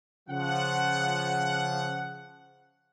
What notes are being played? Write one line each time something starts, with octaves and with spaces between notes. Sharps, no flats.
C#3 F3 F#5